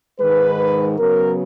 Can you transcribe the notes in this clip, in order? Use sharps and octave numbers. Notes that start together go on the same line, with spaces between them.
G#2 D#3 G#3 B4
C#3 F#3 B3 A#4